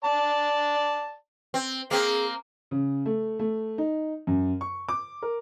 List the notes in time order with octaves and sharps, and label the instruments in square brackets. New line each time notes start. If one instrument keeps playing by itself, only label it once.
[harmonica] D5 A5
[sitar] C4
[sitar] A#3 C4 [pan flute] G#4
[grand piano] C#3
A3
A3
D#4
F#2
C#6
D6
A#4